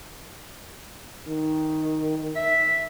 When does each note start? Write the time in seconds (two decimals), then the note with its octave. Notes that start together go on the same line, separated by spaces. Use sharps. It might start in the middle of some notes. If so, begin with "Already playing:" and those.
1.27 D#3
2.36 E5